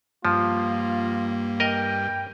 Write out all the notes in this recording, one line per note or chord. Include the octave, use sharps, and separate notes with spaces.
G2 F3 A#3 F4
A#4 D#5 G5